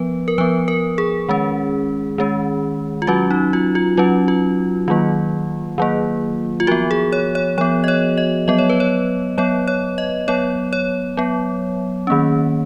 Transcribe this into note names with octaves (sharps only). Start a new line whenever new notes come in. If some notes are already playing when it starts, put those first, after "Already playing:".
Already playing: F3 B3 B4
A#4
F3 B3 B4
A#4
G#4
D#3 G#3 C#4
D#3 G#3 C#4
F4
F#3 C#4 F#4
D#4
F4
F4
F#3 C#4 F4
F4
D#3 F#3 A#3 F4
D#3 F#3 A#3
F4
F3 B3 F#4
G#4
C#5
C#5
F3 B3 C#5
D#5
C#5
D#5
F#3 B3 D#5
C#5
B4
C#5
F#3 B3 C#5
C#5
D#5
F#3 B3 C#5
C#5
F#3 B3
D#3 A#3 C#4